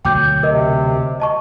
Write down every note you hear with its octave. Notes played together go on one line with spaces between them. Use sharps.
D2 B2 F#3 G5 D6 G6
C3 A#4 D#5
D#5 A5 C#6